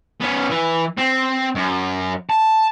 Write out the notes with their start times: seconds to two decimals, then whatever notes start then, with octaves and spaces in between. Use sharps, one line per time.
0.21 B3 C#4
0.50 E3
0.98 C4
1.55 F#2
2.30 A5